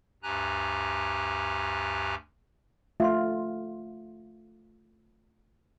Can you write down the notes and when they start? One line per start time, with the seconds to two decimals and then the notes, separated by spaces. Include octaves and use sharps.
0.23 D2 G2 G4 G#5 A#5 F#6
3.00 A3 F4 E5 C6